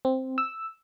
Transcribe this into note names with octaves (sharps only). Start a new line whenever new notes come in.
C4
E6